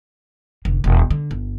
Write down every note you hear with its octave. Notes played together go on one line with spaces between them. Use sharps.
F1 D3
E1
D3
G1